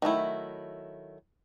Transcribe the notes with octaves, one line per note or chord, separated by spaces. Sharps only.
D#3 F#3 A3 E4